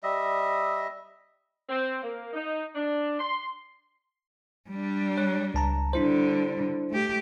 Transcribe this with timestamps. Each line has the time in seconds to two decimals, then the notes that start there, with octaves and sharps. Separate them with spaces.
0.03 G3 D#5 E5
1.69 C4
2.03 A#3
2.33 D#4
2.75 D4
3.20 C6
4.69 G3 D4
5.17 C#5 F#6
5.54 C#2 A5 A#5
5.93 D3 G3 D4 E4 C5
6.90 A3 G4